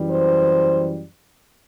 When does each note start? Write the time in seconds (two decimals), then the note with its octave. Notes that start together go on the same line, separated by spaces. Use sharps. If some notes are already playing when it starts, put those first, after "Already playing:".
Already playing: F#2 E3 G3
0.11 C5